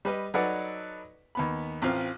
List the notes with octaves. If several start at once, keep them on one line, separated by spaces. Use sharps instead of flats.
G3 B4 D#5
F#3 D#4 A4 B4 D5 F#5
D#2 B3 B5
A1 C4 F4